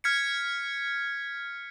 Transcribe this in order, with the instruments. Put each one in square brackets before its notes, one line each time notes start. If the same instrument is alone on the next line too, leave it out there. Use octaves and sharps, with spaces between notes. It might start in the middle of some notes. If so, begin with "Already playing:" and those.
[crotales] F6 G#6 B6 C#7